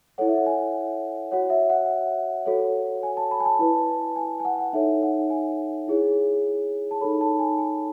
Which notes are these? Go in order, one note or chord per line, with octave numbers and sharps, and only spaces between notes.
E4 A4 C#5 F#5
E5
F#5
G#5
F#4 C#5 F#5
E5
F#5
F#4 A4 C#5
G#5
A5
B5
G#5
A5
E4 B4
G#5
G#5
F#5
F#5
D#4 A4 C#5 E5
F#5
G#5
E4 G#4 C#5
A5
D#4 A4 C#5 B5
A5
G#5
G#5